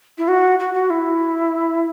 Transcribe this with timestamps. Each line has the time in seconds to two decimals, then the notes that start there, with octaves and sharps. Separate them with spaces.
0.18 E4
0.28 F#4
0.59 F#4
0.74 F#4
0.90 E4